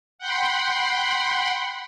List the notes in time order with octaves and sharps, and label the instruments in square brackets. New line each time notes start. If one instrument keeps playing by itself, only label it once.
[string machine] F#5 G5 B5 C6